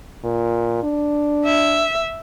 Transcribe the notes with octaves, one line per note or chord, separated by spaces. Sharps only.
A#2
D4
E5